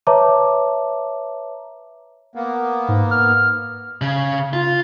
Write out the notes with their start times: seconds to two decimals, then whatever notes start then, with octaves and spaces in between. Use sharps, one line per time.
0.07 B4 C#5 E5 A5 A#5 D6
2.35 A#3 B3
2.88 G#2
3.11 F6
4.02 C#3
4.53 F4